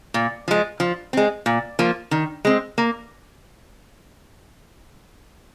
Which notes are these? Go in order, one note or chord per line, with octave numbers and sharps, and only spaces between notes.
A#2
F3 G#3
F3
G#3 C4
A#2
F3 A#3
D#3
G#3 C4
A#3